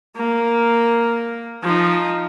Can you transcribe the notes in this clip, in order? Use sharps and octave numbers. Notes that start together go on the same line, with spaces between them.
A#3
F3 D#4